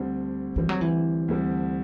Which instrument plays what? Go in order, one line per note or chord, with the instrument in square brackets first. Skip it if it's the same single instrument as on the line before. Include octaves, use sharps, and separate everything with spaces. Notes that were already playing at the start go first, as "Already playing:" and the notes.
Already playing: [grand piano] D2 D3 G3 C4
[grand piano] D2 D3 G3 C4 [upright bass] E3
[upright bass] F#3
E3
[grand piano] D2 D3 G3 C4